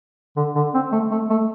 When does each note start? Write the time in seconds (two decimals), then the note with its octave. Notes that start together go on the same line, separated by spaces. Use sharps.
0.36 D3
0.55 D3
0.74 C4
0.92 A3
1.11 A3
1.30 A3